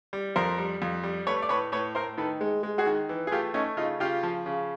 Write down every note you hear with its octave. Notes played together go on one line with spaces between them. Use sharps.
G3
F2 A#4 C5
G3
F2
G3
A3 B4 C#5
D5
A2 B4 C#5
A2 B4 C#5
A2 A#4 C5
D#3 A4 B4
G#3
G#3
F#4 G#4
D#3
E3
G#4
A3 F4 G4
A3 C#4 D#4
C#3 D#4 F4
C#3 F4 G4
F3
C#3